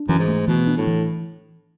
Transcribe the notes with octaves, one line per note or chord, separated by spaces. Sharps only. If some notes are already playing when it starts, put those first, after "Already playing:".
Already playing: D4
F#2 E3
G#2
A3
B2 E3
D4
A2
E3